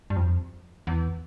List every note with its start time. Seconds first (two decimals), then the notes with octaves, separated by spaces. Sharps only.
0.10 G2
0.16 F2
0.87 E2